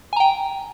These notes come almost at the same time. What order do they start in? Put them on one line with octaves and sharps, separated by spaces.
G#5 A#5 G5